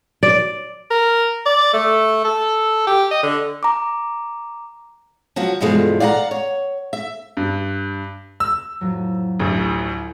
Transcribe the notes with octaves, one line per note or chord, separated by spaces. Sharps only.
D5
A#4
D5
A3
A4
G4
D#5
D3
A#5 D6
F3 F#3 F#4
G2 B2 E3 F3 G#3 A3
D5 F5 F#5 G#5 A#5
C#5
E5
G2
E6
F2 A2 F#3
A1 D2 E4